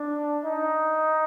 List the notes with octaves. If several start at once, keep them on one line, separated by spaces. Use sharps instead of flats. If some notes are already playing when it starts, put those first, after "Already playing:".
Already playing: D4
D#4